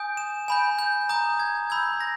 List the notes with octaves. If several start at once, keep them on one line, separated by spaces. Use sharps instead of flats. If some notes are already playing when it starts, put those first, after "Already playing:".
Already playing: G#5 D#6 G6
E7
G#5 B5 G6
G6
A#5 D#6 G6
G#6
B5 E6 G6 G#6
A#6